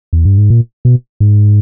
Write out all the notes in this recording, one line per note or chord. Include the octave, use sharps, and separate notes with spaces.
E2
G2
G#2
A#2
B2
G#2